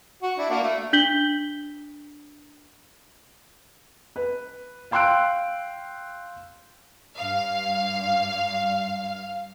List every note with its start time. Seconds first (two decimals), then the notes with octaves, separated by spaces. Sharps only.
0.22 F#4
0.38 D4 E4
0.50 A#3 D4 F#4
0.63 A3
0.93 D4 G6 B6 F#7 G7
4.16 B4
4.91 F5 G5 C6 E6 F#6 D7
7.16 G2 F5